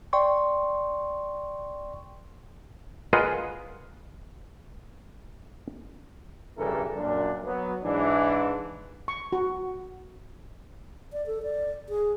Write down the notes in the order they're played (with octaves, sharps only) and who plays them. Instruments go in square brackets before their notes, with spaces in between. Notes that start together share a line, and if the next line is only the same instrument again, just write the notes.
[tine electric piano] D5 G5 C6 C#6
[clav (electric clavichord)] F4 G#4 A#4 B4 D#5 F#5
[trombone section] B1 G2 C#3 E3 A4 A#4
F#2 A#2 D4
F#3 B3
G#2 E3 D4
[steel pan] C#6
F#4
[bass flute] D5
A4
D5
G#4